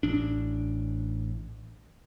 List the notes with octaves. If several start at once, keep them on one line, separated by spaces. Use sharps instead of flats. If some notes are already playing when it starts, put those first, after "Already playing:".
A1 D4